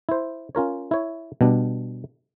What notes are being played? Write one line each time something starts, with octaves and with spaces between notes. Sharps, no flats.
E4 C5
C#4 F4 A#4 C#5
E4 C#5
B2 G3 D4